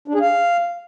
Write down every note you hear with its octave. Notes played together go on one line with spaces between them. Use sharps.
D4
G#4
F5